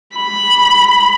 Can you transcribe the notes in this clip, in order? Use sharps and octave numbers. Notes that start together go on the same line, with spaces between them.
B5